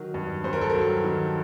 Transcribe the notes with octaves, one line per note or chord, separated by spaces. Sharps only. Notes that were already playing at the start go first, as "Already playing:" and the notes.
Already playing: D#3 F#3
G2
G2 C5
A#4
A4
F#3 A#4
D#3